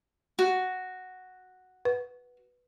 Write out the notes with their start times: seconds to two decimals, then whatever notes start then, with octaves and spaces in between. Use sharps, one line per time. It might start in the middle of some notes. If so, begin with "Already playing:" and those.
0.39 F#4
1.85 B4